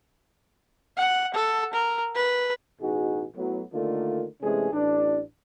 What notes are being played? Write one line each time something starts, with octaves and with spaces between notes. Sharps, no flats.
F#5
A4
A#4
B4
A1 B2 D#4 F#4 G#4
A2 F#3 B3
D3 D#3 A3 A#3 D4 F4
C3 E3 G#3 A3 C#4 G#4
A1 D4